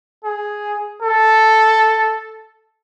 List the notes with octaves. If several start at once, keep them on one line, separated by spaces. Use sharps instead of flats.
G#4
A4